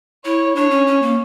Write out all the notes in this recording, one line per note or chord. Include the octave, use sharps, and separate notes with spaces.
E4 C#5
D4 C#5
C#4
C#4
A#3